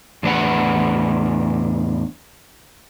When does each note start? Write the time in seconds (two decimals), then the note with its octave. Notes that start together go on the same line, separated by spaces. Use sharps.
0.23 E2 A2 D4 B4 F#5